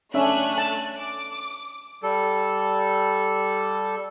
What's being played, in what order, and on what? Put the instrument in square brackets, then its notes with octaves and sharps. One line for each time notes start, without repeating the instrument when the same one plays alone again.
[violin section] A3 G#5 F#6 [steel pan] C#4 D4 E5
[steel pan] A5
[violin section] D6
[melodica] G3 A4